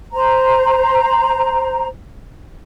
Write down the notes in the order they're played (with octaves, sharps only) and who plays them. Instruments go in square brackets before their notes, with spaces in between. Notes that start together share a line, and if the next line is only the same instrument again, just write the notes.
[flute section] C5 A#5